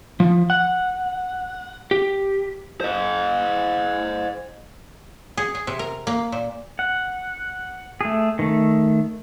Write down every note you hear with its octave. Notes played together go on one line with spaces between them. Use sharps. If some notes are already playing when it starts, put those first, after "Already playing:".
F3
F#5
G4
C5 D#5
G#4
G#4
C3
A#4
A#3
A#2
F#5
A3 G#4
D#3 A3